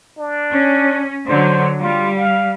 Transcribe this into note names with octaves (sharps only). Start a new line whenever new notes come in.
D4
C#4
D3 F#3 C5
G3 F4
F5